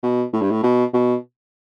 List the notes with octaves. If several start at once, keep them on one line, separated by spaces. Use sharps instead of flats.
B2
A2
G2
A2
B2
B2